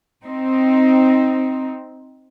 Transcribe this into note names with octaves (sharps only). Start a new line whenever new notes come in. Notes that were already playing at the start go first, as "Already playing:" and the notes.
C4 D#4